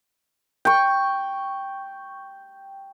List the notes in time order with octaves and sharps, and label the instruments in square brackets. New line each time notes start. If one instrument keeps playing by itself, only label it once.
[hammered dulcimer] G5 C#6